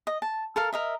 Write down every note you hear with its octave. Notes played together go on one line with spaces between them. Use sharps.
D#5
A5
A4 A#4 F5
A#4 D#5 E5